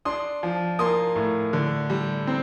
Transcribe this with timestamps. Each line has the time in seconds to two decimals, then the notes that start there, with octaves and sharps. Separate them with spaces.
0.05 D4 C6 D#6
0.43 F3
0.79 A#3 C6 D#6
1.16 A2
1.53 D3
1.90 G3
2.27 C4